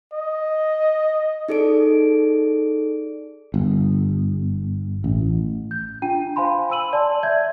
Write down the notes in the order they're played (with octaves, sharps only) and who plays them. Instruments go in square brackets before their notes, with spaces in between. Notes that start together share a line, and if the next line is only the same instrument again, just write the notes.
[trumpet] D#5
[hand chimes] D#4 G#4 A4 D5 D7
[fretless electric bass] G1
A1
[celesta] G6
D4 F4 G5 D#7
C5 F5 G#5 B5 C6
G#5 B5 E6 D#7 F#7
D5 A5 C6
D5 E5 G6 G#6